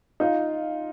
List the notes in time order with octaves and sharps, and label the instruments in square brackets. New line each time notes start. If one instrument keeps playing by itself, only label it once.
[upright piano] D#4 F4